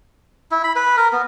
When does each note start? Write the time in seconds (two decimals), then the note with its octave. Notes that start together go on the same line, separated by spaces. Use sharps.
0.51 E4
0.64 B5
0.76 B4
0.97 A#4
1.13 B3